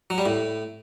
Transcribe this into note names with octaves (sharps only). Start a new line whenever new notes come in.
F#3
G3
A2